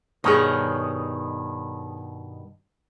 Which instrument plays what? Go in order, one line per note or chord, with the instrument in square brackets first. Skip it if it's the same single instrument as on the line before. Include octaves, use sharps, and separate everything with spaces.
[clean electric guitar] G2 B2 D#3 [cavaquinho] G#4 C#5 D#5